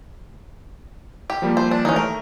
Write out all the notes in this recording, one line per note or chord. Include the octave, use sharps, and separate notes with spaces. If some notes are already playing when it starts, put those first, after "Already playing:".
G4
F3 G3 A#3
C5
D4
D#3 E3 C#4 D#4
A3 A#4